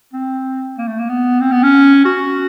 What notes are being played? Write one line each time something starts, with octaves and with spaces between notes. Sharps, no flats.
C4
A#3
A3
A#3
B3
C4
B3
C#4
F#4